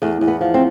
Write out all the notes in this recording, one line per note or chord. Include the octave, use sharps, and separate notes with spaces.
E2 A3
E2
B3
F3
C4